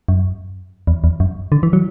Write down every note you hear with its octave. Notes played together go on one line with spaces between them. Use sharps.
F#2
E2
E2
F#2
D3
E3
F#3